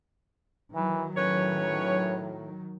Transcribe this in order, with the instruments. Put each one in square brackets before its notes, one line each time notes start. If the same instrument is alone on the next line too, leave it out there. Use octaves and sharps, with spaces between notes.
[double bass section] D#3 F#3 [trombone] E3
[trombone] A2 [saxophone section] C#4 B4 C#5